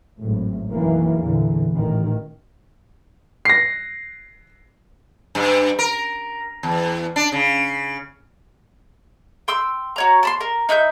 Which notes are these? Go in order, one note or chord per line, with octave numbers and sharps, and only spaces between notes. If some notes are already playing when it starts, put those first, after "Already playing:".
G#1 F#2 A2
B1 F#2 D#3 E3 A#3
E2 A#2 D3 E3
A1 A#2 D#3
A#6 C7
G2
A#4
E2
D4
C#3
G5 C6 E6
F#4 C#5 A#5
A5 B5 C6
A#4
D#4 E4 F#6 G6